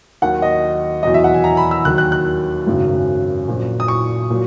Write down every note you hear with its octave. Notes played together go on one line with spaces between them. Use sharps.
D#2 D#3 F#3 F#5
D#5
E2 B2 F#3 D#5
E5
F#5
G#5
A#5
B5
E6
D#2 D#3 F#3 F#6
F#6
F#6
G#1 F#2 C#3 F#3
A#1 A#2 F#3
D#6
C#6
A#2 F#3